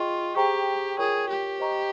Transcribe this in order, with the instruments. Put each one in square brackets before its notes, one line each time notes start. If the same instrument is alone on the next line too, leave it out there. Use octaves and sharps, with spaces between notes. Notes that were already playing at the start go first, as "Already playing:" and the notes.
Already playing: [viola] F4 [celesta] G#4 D#5 G5 C#6
[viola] G4 [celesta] G#4 C5 G5 A#5 C#6
[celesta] F4 A#4 C#5 G5 C#6 [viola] G#4
[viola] G4
[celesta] C5 D#5 A#5 C#6